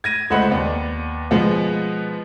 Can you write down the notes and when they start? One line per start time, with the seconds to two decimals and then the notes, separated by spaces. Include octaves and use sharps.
0.04 G#6 A#6 D#7
0.30 C#2 A3 C5 D#5 F#5 B5
0.50 D#2 B3 D5
1.31 B2 F3 G#3 B3